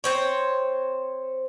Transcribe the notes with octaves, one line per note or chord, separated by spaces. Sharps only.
C4 C5 C#5